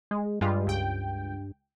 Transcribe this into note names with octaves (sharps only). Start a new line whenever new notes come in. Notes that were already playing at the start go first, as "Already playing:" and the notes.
G#3
G2 G3 G#3 F4
C#2 G5